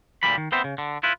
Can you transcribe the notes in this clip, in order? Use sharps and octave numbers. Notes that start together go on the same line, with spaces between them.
D2 A#2 G3 B5
D#3
B3 C4 C5 E5
C#3
D3
E4 F4 B4